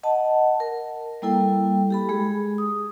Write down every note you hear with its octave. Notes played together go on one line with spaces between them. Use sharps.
D#5 F#5 A5
A#4
G3 A#3 E4 A4 G5
G4 A4 B5
G#3 G#4
D#6